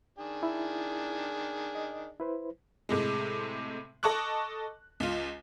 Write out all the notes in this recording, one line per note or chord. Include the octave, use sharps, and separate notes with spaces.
D#3 D4 G#4
E4
D#5
E4 B4 C5
A2 C3 G#3
A4 D#5 A5 C#6 D6 F#6
C#2 F4